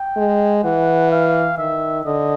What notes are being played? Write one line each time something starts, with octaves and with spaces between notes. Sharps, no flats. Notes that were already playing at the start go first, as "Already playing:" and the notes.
Already playing: G5
G#3
E3 F#5
F5
D#3 E5
D3 D#5